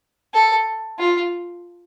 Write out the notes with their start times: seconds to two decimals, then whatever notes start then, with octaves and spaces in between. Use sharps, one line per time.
0.34 A4
0.99 F4